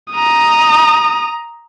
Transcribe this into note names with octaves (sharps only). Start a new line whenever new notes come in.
A#5 D#6